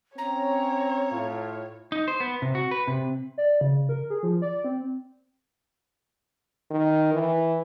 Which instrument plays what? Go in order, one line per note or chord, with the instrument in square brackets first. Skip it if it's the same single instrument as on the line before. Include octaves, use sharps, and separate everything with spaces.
[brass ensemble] C4 C#4 [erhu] C#5 [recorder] A#5
[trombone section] A2 F4
[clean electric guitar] D#4
C5
B3
C3
F#4
B4
C3
[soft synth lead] D5
C#3
A#4
G#4
F3
D5
C4
[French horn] D#3
E3